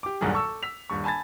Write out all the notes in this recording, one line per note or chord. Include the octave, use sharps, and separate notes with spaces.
G4 D6
D#1 B1 G2 A#2 F#3 G#4
A4 C#6 E6
E6 B6 F7
D#1 G2 C#6
G#5 A5 B5 G#6 A6